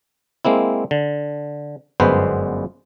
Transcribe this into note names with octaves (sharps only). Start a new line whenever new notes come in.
G#3 A#3 C4 E4
D3
G1 F#2 G#3 B3 B4 C5